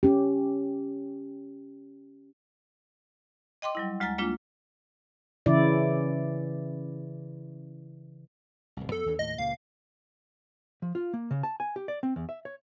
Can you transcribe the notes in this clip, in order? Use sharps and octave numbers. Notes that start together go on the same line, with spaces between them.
C#4 G4
D#5 G5 C6 D6
F#3 G3 E4
D2 G#3 G#5 A#5 A6
G#3 A#3 D4 F4
C#3 E3 E4 D5
D1 C2
F2 B3 A4
D#2 E3 D4
D#2 A2 D#5
C#2 A#2 A#3 F5
F3
F4
A#3
C#3
A5
G#5
G4
D5
C4
E2
E5
C#5